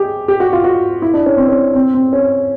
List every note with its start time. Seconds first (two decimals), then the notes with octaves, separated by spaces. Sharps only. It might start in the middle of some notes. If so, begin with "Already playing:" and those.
Already playing: G4 G#4
0.28 G4
0.40 F#4
0.53 F4
0.64 F#4
1.02 E4
1.14 D4
1.26 C#4
1.37 C4
1.49 C#4
1.75 C4
1.94 C4
2.13 C#4